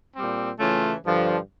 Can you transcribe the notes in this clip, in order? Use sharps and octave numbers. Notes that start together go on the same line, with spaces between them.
A#2 G3 C4
C#3 E3 A3 C#4 F4
G2 D3 F3